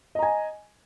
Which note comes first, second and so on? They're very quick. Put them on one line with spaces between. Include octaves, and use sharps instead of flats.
D#5 A#5 G#5